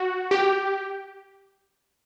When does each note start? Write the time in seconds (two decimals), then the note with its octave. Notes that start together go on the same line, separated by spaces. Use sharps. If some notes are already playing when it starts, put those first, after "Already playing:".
Already playing: F#4
0.31 G4